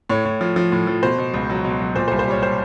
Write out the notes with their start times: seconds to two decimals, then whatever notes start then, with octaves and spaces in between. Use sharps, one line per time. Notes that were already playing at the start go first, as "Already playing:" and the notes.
0.10 A2 C#5
0.25 A2
0.41 F3
0.56 F3
0.72 A2
0.87 F3
1.03 B2 C5
1.18 B2
1.34 C#2
1.49 F#3
1.65 B2
1.81 F#3
1.96 A#2 C5
2.08 C5
2.11 C2
2.19 C5
2.27 G3 C#5
2.42 G3 C5